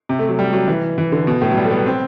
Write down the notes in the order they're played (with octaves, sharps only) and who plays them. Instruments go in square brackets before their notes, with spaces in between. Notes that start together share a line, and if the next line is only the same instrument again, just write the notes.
[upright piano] C3
A3
F#3
G3
F#3
E3
E3
D3
B2
A2
F#3
G3
A3
B3
C4